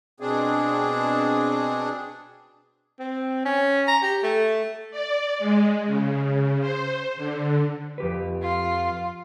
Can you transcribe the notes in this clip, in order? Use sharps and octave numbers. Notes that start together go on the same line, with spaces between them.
B2 C4 D4 G#4
C4
C#4
A#5
G4
A3
D5
G#3
C#3
C5
D3
F2 G4 B4
F4